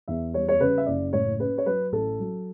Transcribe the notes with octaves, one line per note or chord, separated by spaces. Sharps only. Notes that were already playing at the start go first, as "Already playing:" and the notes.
E2 E5
G3 C#5
C#5
C#3 B4
E5
F#1 D5
A2 C#5
C#4 B4
C#5
F#3 B4
A1 A4
F#3